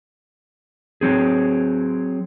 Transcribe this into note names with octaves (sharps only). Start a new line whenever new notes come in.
F#3 C4 G#4